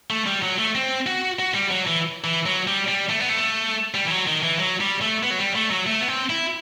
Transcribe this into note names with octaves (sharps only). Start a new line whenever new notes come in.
A3
G3
F#3
A3
C4
F#4
F#4
G3
F#3
E3
E3
F#3
G3
G3
A3
B3
A3
G3
E3
F#3
D#3
E3
F#3
G3
A3
B3
F#3
G3
A3
F#3
A3
B3
C4
E4